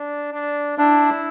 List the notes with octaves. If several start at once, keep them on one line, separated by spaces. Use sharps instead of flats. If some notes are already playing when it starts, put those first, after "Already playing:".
Already playing: D4
D4
D4 E4